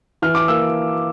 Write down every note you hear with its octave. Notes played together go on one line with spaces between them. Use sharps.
E3 F6
D6
A#3 E6